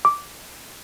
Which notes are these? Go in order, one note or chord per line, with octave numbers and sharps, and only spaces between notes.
D6